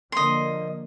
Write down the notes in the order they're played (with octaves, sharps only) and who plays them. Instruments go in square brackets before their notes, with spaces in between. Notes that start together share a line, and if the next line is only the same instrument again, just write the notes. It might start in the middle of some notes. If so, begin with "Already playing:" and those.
[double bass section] D3 F3 A#3 [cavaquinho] D#5 C6